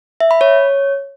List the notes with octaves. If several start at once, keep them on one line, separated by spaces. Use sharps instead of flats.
E5
B5
C#5